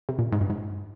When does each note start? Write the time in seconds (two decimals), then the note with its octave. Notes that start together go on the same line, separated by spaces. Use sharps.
0.09 C3
0.19 A#2
0.32 G#2
0.41 G2
0.50 G#2